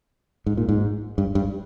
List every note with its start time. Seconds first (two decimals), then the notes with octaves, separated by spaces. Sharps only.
0.46 G#2
0.57 A#2
0.69 G#2
1.18 G2
1.35 G2